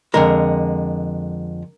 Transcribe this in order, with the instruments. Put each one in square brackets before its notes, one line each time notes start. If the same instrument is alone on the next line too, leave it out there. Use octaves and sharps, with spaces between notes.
[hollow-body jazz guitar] F2 D3 G#3 A#4